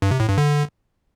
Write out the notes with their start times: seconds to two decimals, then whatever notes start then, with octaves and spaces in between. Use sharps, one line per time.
0.02 G2
0.11 C3
0.20 A2
0.29 G2
0.38 D3